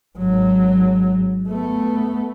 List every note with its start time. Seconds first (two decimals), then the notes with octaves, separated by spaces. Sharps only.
0.18 G#1 F#3
1.49 A3 B3